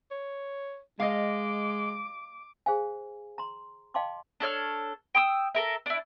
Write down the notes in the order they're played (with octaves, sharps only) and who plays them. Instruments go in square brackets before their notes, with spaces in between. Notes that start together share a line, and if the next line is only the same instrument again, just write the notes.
[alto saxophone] C#5
[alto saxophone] G#3 [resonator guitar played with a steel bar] D#5 F5 [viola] D6
[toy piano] G#4 C5 F5 G#5
A#5 C6
D#5 F5 G5 A5 C6 D6
[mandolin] D4 A4 C#5 F6
G5 D#6 E6
A4 A#4 E5
D4 E4